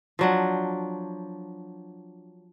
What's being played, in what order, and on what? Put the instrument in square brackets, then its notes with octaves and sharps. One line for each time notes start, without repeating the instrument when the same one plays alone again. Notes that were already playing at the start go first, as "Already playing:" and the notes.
[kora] F3 F#3 D4